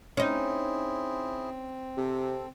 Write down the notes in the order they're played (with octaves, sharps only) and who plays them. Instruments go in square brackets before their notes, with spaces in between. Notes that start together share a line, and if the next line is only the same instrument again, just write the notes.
[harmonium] C4 [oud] C#4 D#4 [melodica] E4 G#4 C5
[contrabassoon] C3 [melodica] A4